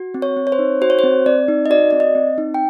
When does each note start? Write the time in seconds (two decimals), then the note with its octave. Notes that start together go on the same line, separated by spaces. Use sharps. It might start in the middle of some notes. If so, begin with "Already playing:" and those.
Already playing: F#4
0.14 C4
0.22 C#5
0.37 C4
0.47 C#5
0.52 C5
0.59 D#4
0.81 F#4 C5
0.90 C#5
0.99 C5
1.04 C4
1.26 C4 D5
1.48 D#4
1.66 D#5
1.70 F#4 D5
1.91 C4 D5
2.00 D#5
2.15 C4
2.38 D#4
2.54 G5